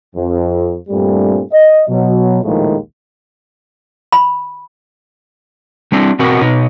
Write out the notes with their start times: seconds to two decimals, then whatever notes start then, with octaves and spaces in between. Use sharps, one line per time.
0.16 F2
0.90 G2 A#2 G3 A3 C4 D4
1.52 D#5
1.89 B2 F#3
2.43 A#1 D#2 A2 D#3 F3 G#3
4.12 B5
5.92 G3 C4 D4 E4
6.19 B2 C4 F#4 A#4 F#5
6.41 B2 D#4